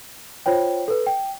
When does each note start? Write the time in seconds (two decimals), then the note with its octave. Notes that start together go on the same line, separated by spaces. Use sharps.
0.46 F4 C5 C#5 G5
0.88 A4 B4
1.07 G5